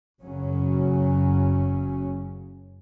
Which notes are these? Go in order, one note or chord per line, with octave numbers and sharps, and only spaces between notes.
F#1 F#2 C#3 F#3 C#4